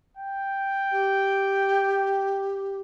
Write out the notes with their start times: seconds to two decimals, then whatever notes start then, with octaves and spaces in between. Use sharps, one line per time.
0.17 G5
0.92 G4